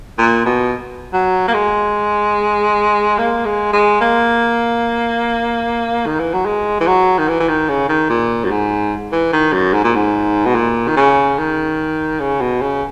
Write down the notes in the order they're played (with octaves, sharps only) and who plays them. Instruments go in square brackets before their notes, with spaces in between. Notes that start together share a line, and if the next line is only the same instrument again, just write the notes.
[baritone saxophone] A#2
B2
F#3
A#3
G#3
A#3
G#3
G#3
A#3
D#3
E3
F#3
G#3
E3
F#3
D#3
E3
E3
D#3
C#3
D#3
A#2
F#2
G#2
E3
D#3
F#2
G#2
A#2
G#2
B2
A#2
D#3
C#3
D#3
C#3
B2
C#3